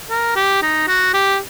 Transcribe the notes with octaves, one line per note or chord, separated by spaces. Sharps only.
A#4
G4
D#4
F#4
G4